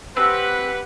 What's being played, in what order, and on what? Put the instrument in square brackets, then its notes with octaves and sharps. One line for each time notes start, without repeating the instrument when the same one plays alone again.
[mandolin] C4 [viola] G4 F#5 [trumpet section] B4